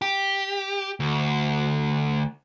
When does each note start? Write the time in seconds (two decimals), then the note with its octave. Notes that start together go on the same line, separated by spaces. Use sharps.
0.02 G4
1.00 D2